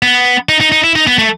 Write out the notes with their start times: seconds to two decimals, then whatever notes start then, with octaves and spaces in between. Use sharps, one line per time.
0.02 B3
0.49 D#4
0.60 D#4
0.72 D#4
0.84 E4
0.96 D#4
1.07 B3
1.18 A3